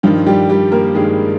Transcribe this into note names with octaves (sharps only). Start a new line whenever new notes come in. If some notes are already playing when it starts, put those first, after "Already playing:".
G2 D#3 F3 F4
G3 G4
G3 G4
A#3 A#4
G2 D#3 G#3 G#4